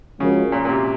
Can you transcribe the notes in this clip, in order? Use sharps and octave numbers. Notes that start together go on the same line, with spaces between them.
C#3 F3 G#3 C#4 F#4 A#4
A#2
A#2
C3